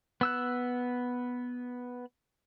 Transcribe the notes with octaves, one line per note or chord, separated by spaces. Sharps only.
B3 E6 F#6